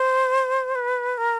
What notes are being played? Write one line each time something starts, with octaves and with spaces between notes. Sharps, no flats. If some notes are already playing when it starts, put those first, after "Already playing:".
Already playing: C5
B4
A#4